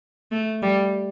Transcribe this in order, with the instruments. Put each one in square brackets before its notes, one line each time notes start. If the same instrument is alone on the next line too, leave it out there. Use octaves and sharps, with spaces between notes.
[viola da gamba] A3
G3